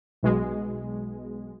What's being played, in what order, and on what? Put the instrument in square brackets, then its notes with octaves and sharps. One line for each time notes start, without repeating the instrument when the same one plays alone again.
[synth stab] B1 B2 G#3